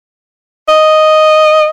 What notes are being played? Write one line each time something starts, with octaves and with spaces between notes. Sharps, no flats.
D#5